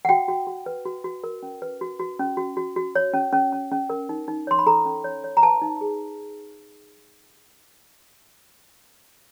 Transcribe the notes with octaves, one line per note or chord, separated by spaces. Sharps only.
F#5
F#4 G5
F#4
F#4
B4
F#4
F#4
A#4
C#4
B4
F#4
F#4
C#4
F#4
F#4
F#4
C#5
C#4
C#4
C#4
C#4
A#4
D#4
D#4
C#5 C6
B5
A4 A#5
C#4
C#5
C#5
A#5
B4 A5
D#4
G#4